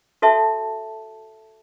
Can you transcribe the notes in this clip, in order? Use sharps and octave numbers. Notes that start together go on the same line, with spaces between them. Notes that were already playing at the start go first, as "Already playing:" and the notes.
F#4 A4 C#5 E5 A5